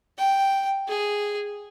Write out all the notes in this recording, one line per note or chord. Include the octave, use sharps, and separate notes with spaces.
G5
G#4